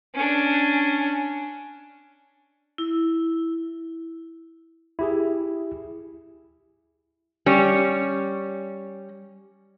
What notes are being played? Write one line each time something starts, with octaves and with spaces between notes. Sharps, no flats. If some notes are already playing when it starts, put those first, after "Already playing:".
C#4 D4
E4
E4 G4 G#4
G3 C#4